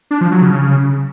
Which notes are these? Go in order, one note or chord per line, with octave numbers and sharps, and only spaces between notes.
D4
F3
F#3
C#3
C#3